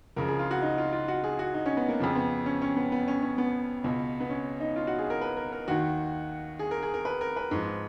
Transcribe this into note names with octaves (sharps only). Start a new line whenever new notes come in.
C#2 C#3 F3 A#4
G#4
F4
F#4
D#4
F4
F4
F#4
G#4
F#4
D#4
C#4
B3
A#3
F2 C#3 F3
B3
C#4
C#4
B3
B3
C#4
C#4
B3
C#2 B2
B3
C#4
D#4
F4
F#4
G#4
A#4
B4
A#4
A#4
D#2 D#3 F#4
G#4
A#4
G#4
A#4
B4
A#4
B4
G#2 F3